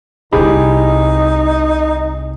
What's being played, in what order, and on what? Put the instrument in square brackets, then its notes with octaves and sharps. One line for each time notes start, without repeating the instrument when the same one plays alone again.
[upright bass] C2 C3 [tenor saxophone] D#4 [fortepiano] G4 G#4 B5